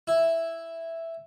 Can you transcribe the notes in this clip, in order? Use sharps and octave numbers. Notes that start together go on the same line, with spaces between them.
E4